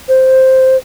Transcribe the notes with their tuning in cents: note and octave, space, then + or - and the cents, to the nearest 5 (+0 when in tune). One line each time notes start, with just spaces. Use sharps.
C5 +0